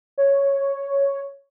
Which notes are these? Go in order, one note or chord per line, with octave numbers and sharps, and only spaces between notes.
C#5